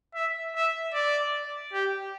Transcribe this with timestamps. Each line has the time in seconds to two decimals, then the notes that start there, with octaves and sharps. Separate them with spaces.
0.15 E5
0.55 E5
0.93 D5
1.73 G4